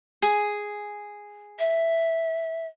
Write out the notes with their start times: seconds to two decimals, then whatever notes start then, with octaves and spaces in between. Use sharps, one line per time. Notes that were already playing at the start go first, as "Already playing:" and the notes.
0.22 G#4
1.59 E5